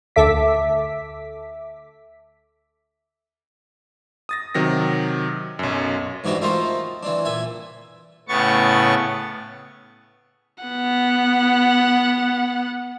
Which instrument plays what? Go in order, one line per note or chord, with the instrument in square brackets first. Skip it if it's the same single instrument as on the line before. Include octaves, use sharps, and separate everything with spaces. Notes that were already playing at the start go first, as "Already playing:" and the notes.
[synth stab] D2 A4 E5 D6 B6
[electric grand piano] D#6 A6 A#6
C3 D#3 F#3 A#6
B1 F#2
[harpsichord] G#2 E3 D4 F#4 G4
A3 C4 F4 A#4 C5 D#5
E3 C4 D4
A#2 E5 G#5
[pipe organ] A2 C#3 B3 C#6 A6
[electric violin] B3 F#5